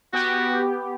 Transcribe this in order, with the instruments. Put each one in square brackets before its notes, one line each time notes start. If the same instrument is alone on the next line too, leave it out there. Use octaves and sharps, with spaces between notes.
[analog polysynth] B3 G4 [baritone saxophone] F#4